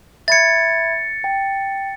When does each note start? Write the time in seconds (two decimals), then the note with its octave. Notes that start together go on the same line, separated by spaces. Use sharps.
0.28 E5 B5 G#6 A6 C#7
1.24 G5